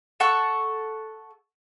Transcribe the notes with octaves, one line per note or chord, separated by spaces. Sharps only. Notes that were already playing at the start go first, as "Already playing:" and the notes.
A4 F#5 C#6